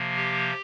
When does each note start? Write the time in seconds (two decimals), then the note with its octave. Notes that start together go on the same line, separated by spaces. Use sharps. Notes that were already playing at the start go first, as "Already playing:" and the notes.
Already playing: C3 F3 A#3
0.16 G4